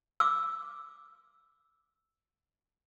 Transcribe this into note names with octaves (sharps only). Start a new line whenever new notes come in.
D6 E6